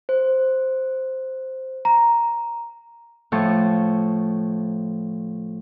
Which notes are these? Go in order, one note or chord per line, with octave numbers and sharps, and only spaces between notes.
C5
A#5
A2 F3 A5 C#6